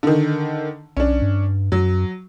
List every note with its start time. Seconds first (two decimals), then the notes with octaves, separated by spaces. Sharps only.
0.03 D3 D#3
0.97 B1 C#4 D4
1.22 G2
1.72 F#2 F#3